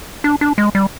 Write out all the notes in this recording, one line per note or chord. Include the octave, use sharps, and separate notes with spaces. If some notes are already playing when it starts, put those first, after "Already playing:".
D4
D4
G#3
G3